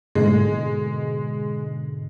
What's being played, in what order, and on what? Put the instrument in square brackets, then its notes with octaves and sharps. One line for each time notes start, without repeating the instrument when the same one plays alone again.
[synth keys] G#2 B2 D3 [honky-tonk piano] G#3